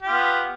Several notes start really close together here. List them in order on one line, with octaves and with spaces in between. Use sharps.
G4 F4 B3